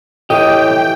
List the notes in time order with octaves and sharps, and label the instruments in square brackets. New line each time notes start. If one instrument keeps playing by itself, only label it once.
[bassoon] A2 [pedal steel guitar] E3 G4 [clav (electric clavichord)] D#5 [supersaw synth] G5